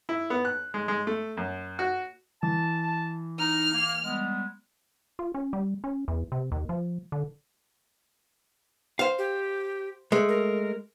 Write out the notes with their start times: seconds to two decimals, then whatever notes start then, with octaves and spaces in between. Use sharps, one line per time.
0.09 E4
0.30 B3
0.45 F#6
0.74 G#3
0.88 G#3
1.07 A3
1.37 F#2
1.79 F#4
2.43 E3 A5
3.39 D#4 F6
3.73 A#3
4.04 G3 G#3 B3
5.19 F4
5.34 C#4
5.53 G3
5.84 C#4
6.08 E2
6.32 C3
6.52 D#2
6.69 F3
7.12 D3
8.99 C5 F5
9.18 G4
10.12 G#3 A3
10.28 A#4